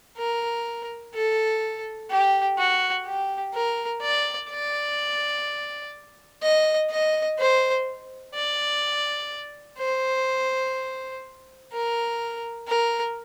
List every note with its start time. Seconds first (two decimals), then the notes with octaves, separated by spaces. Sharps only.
0.18 A#4
1.14 A4
2.10 G4
2.58 F#4
3.06 G4
3.54 A#4
4.02 D5
4.50 D5
6.43 D#5
6.91 D#5
7.39 C5
8.35 D5
9.79 C5
11.72 A#4
12.68 A#4